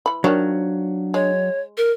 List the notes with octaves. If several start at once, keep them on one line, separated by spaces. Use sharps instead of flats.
E3 B5
D#3 F3 F#3 D4 C#5
G#3 C#5
A#4